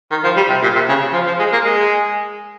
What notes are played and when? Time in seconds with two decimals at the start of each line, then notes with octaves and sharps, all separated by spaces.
0.11 D#3
0.24 F3
0.37 G3
0.49 C3
0.62 A#2
0.75 C3
0.89 C#3
1.13 F3
1.27 F3
1.39 G#3
1.53 A#3
1.65 G#3